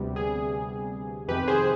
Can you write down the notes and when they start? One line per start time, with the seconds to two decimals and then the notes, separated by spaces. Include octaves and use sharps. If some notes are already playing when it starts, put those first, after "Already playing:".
Already playing: D2 C3 G3 B3
0.16 G#4
1.28 F2 C3 D#3 G4 B4
1.48 G#4 C5